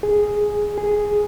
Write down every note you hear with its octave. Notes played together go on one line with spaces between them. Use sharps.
G#4
G#4